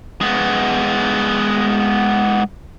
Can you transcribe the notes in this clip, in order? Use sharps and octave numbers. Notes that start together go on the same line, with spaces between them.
G#3 B3